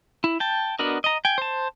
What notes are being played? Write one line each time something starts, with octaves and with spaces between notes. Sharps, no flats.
E4
G5 A5
B3 D4 F#4 A#4 D#5
D#5 A#5
G5 G#5
C5 A5